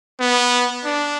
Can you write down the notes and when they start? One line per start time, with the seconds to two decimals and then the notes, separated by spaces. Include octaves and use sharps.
0.20 B3
0.85 D4